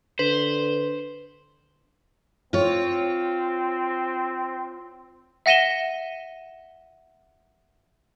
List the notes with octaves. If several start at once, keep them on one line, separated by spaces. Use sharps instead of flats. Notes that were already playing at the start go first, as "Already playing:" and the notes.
D3 B4 C5
C4 F4 C#5
E5 F#5 A#6 D#7 E7 G7